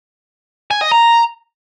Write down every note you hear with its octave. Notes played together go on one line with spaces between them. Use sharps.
G#5
D#5
A#5